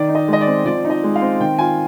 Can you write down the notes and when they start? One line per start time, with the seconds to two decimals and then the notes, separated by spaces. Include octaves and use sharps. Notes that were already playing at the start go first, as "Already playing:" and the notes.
Already playing: D#3 D5
0.09 D#4
0.15 D#5
0.28 G#3 D#5
0.41 D5
0.47 C4
0.65 F3 D5
0.85 D#4
0.90 D#5
1.03 G#3
1.16 F5
1.22 C4
1.40 D#3 G5
1.58 F4 G#5